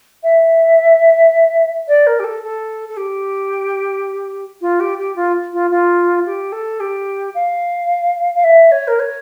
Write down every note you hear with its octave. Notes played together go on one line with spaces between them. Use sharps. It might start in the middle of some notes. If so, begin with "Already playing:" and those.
E5
D5
A#4
G4
A4
A4
A4
G4
F4
G4
G4
F4
F4
F4
G4
A4
G4
F5
F5
E5
C#5
A#4
C#5